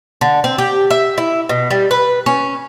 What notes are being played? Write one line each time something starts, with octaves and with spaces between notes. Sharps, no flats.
D3
C4
G4
E5
E4
B2
G3
B4
C#4